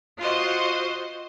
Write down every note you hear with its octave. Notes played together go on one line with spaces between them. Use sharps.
F4 F#4 C5 D#5